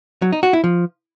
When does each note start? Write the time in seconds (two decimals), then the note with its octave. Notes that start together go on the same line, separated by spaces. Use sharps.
0.22 F#3
0.32 D#4
0.43 F#4
0.53 E4
0.64 F3